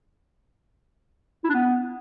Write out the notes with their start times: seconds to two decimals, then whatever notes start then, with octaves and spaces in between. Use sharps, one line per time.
1.44 E4
1.49 D4
1.55 B3